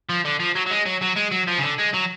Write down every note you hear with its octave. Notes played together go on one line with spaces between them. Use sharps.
F3
D3
F3
F#3
F#3
G#3
F#3
F#3
G#3
F#3
F3
C#3
D3
G#3
F#3